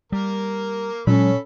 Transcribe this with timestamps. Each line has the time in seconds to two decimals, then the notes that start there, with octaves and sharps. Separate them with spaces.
0.12 G3 A#3 A#4
1.07 A#2 F#3 G#3 C#4 A4 B5